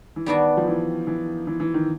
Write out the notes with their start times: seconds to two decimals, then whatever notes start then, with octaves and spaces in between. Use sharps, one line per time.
0.16 E3
0.26 D#3 G3 B3 D4 F#4
0.57 F3
0.67 E3
1.07 E3
1.47 E3
1.60 E3
1.74 D#3